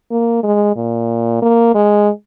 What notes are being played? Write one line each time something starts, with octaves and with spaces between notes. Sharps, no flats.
A#3
G#3
A#2
A#3
G#3